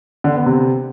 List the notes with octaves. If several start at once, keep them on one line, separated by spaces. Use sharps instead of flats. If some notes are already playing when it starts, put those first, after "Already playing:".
D3
B3
C3